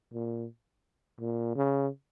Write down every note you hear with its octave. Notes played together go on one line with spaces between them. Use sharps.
A#2
A#2
C#3